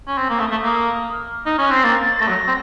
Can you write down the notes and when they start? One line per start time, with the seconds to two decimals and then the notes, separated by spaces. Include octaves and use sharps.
0.07 C#4
0.18 C4
0.29 A#3
0.40 A3 D#6
0.52 A3
0.64 A#3 F6
0.76 D#6
1.12 F6
1.46 D#4
1.57 C#4 F6
1.66 F#6
1.71 C4 C7
1.83 A#3 A6
2.19 A3 A#6
2.29 F#3
2.47 C4